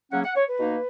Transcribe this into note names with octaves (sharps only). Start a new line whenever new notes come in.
C#3 F#3 A#3 C#4 F#5
F#5
C#5
B4
B2 A#3 D#4